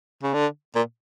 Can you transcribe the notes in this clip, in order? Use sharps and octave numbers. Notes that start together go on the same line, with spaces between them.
C#3
D3
A#2